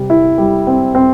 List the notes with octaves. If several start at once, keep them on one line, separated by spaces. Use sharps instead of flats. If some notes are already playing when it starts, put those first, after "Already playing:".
Already playing: C3 G3
E4
G3
C4
C4